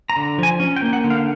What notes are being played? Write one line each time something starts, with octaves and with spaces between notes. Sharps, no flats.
A#5
D3
F3 G#5
C#4
G5
A#3
F#5
D3
F5